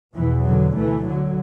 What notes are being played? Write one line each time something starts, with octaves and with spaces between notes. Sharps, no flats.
E2 B2 E3
D3 F#3
D2 E3 A3
D3 F#3